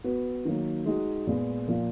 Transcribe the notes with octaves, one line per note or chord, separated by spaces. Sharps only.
B3 F#4 B4
D#3 F#3 A#3
G#3 D#4 F#4
A#2 G#3 B3
A#2 F3 A#3 F4